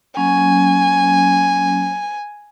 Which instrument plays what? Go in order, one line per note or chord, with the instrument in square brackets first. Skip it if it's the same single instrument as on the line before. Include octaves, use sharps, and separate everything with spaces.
[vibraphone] F#3 A#3 C#4 [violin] G#5